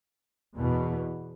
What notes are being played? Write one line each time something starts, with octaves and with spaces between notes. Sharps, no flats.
E2 B2